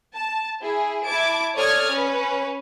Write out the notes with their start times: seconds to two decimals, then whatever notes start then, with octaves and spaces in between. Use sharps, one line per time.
0.15 A5
0.61 E4 G#4
1.05 E4 A5 D6 G#6 D7
1.56 A4 C#5 D5 D#6 F6 G#6
1.90 C#4 B4